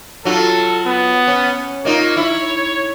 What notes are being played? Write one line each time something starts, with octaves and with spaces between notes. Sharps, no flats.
F#3 F4 A4
B3
C#4
A#3 D#4 F4 C#5
E4